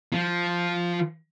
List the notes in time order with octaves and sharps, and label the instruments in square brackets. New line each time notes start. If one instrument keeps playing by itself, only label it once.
[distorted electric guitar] F3